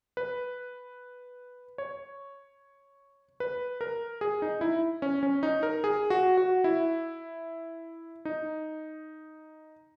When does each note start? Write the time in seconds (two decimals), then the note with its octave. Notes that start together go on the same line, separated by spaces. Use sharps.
0.17 B4
1.78 C#5
3.40 B4
3.81 A#4
4.21 G#4
4.42 D#4
4.61 E4
5.02 C#4
5.23 C#4
5.43 D#4
5.63 A#4
5.84 G#4
6.10 F#4
6.37 F#4
6.64 E4
8.25 D#4